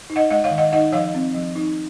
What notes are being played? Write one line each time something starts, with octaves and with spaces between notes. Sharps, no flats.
D#4
D#5 F#5
G#3 D#5 F#5
C#5 F5
D#3
D#5 F#5
D#4 D#5 F#5
F3 C#5 F5
C4
F3
D#4